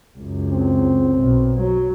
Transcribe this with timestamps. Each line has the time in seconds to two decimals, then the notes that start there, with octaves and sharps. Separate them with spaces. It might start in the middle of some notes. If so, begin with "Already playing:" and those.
0.18 C#2 F#2
0.52 C4
1.18 B1
1.56 F#3